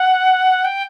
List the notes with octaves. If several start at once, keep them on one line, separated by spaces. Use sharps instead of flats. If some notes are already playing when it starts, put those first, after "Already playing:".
Already playing: F#5
G5